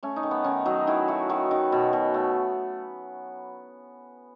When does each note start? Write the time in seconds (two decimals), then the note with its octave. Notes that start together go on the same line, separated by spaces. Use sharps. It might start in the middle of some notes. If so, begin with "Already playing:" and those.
0.03 A3 C#4
0.16 D#4
0.23 D#3
0.31 B3
0.44 D#3 C#4
0.66 F#3 D#4
0.87 D#3 E4
1.08 A3 F#4
1.29 D#3 F#4
1.51 D#3
1.72 B2
1.93 B2
2.14 A3